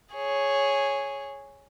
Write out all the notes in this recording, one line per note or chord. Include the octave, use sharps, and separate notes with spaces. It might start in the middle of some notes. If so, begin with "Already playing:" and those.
G#4 C#5